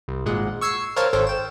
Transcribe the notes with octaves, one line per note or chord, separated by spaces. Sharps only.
C2
G#1 A#2 G#3 F#5
C#6 E6 G#6 C7 C#7
A#4 C5 C#5 F5 G5 A5
G#1 A4 C5 C#5 G5
G5 E7